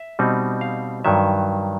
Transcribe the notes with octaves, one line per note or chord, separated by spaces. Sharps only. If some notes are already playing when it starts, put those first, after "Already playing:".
Already playing: E5
B2 G3 C4 D#4
F5
G2 D#3 F#3 E5